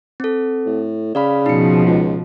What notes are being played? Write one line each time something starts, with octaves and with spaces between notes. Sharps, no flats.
C4 A4
A2
C#3 D5 F5 B5
B2 F3 D#4 C#7
C#2